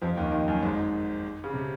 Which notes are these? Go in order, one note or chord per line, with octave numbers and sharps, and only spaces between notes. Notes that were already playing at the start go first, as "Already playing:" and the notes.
F2 F3
D#2 D#3
D#2 D#3
F#2
G#1 G#2
C#3
C3